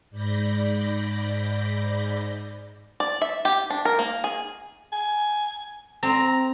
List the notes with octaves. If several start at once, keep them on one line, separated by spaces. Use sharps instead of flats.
G#2 D5 B5 G6 A#6
D5
E5
G4
D4
A#4
A#3
G#4
G#5
C4 A#5